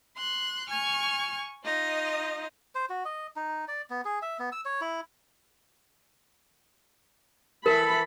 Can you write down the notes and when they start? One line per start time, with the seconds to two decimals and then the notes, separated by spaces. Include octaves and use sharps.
0.17 C6 F#6
0.69 G#5 C#6 F6 G#6
1.64 D#4 F4 D#5
2.75 C5
2.89 F#4
3.05 D#5
3.36 D#4
3.68 D5
3.90 B3
4.05 G#4
4.22 E5
4.39 B3
4.52 E6
4.65 C#5
4.81 E4
7.66 E3 A4 A#4 B5